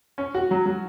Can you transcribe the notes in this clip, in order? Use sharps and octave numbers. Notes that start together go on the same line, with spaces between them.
C#4
F#4
F#3
F#3